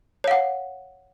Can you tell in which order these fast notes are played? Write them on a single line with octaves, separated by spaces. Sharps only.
C#5 F5 F#5